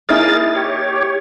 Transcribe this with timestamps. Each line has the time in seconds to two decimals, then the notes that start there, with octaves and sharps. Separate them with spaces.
0.09 A#3 D#4 E4 G#4 A#4 A6
0.56 G4 C#5